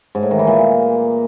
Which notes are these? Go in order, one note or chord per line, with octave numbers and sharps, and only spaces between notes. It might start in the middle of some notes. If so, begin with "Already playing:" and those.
G#2
A2
D#3
E3
A#2